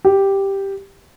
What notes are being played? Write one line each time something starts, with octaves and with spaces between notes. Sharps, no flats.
G4